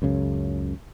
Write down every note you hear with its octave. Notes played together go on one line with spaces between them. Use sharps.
C#2 F#2 C#3